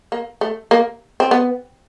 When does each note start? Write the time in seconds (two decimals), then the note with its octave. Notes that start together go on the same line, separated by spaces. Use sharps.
0.12 A#3
0.41 A3
0.71 A#3
1.20 C4
1.31 B3